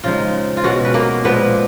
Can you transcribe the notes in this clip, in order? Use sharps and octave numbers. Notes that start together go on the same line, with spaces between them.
C#3 F3 G#3 D#4 F4
F4
B2 G#3 C#4 F#4
B4
A#3 A#4
A#2 F3 G#3 B3 B4